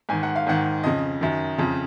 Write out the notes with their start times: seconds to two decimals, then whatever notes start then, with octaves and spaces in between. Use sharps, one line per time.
0.09 G#2 D#3 G#5
0.23 F#5
0.36 F5
0.47 G#2 D#3 F#5
0.84 F2 C#3 D#5
1.21 F#2 D#3
1.58 F2 C#3